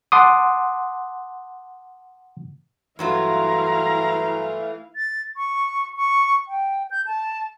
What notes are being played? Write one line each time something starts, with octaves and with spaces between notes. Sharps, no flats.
F#5 A5 C6 D6 D#6
G2 E3 F#3 A3 E4 F4 F5 A#5
A6
C#6
C#6
G5
G6
A5